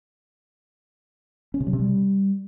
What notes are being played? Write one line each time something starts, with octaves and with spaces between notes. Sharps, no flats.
C#4
C3
F#3
C3
G3